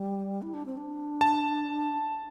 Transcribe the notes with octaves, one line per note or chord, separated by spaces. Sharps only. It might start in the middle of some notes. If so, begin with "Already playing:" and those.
Already playing: G3
E4
D4
C4
D4
A5